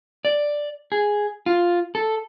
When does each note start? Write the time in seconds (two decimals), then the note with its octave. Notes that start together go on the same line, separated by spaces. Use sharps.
0.25 D5
0.92 G#4
1.46 F4
1.95 A4